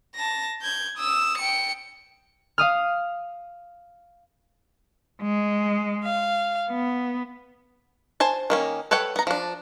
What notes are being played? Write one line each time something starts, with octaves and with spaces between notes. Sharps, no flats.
A5 A#6
G6 G#6
D#6 E6
G5 C#7
F5 D#6 F6
G#3
F5
B3
C5 G#5 A5
D#3 A#3 C#4
A4 B4 C#5 F#5 G5
B3 A#5
F3 D4